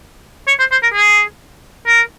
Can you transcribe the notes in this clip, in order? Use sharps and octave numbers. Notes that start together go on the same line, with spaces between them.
C#5
C5
C5
A#4
G#4
A#4